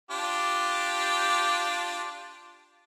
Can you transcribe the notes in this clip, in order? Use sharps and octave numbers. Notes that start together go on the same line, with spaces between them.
D4 F4 G4